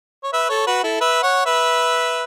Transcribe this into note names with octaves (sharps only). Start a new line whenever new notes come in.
C#5
B4 E5
A4 C#5
F#4 B4
E4 A4
B4 E5
C#5 F#5
B4 E5